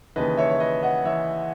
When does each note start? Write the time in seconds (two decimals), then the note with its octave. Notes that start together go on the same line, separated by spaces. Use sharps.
0.16 D#2 C#3 E3 B4 D#5
0.37 C#5 E5
0.50 C#5
0.60 B4 D#5
0.83 D#5 F#5
1.05 E3 C#5 E5